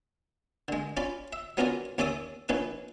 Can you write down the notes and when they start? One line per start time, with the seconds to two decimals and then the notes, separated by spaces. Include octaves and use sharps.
0.68 D3 G#3
0.97 C#4 F4 D5 B5
1.33 E5
1.57 F#3 B3 C#4 F4 A#4 D5
1.98 D#2 C#4 D5 E5 D6 D#6
2.49 A#1 C#4 D#4 B4